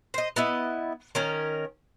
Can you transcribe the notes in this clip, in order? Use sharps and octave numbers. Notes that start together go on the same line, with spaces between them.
C5 D#5
B3 E4 D#5
D#3 C#4 A#4